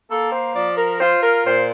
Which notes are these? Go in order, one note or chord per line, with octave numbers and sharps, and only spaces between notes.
A#3 A4
C5
F3 D5
A#4
F4 C5
A#4
A#2 C5